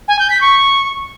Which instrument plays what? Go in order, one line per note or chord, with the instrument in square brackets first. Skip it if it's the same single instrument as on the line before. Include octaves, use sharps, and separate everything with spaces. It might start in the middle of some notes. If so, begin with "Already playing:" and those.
[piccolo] G#5
G6
B6
C#6